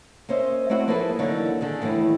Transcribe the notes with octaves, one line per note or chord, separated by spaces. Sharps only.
A#3 C#4 C5 D#5 E5
A3 C4 E4 F#4 C5 C#5
F3 A#3 E4 G#4 A4 B4
D3 E3 F#3 A#3 D#4 C#5
D3 D#3 G#4
D#2 E3 G3 A3